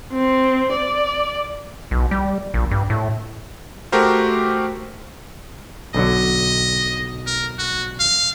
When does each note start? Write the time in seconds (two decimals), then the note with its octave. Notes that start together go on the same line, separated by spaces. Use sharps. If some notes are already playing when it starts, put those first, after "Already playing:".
0.12 C4
0.72 D5
1.91 B1
2.11 G3
2.54 A#1
2.71 G2
2.90 A2
3.92 A3 F#4 G4 A#4 C5
5.94 B1 D3 F#3 D#5
7.27 A#4
7.59 F#4
8.00 F5